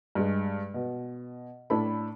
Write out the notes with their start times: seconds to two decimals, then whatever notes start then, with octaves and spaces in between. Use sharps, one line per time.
0.15 G2 G#3
0.74 B2
1.70 A2 D4 A4 B5